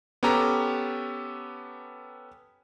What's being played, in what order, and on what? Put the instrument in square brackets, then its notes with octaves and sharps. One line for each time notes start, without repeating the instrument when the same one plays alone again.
[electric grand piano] B3 C#4 G4 A4 A#5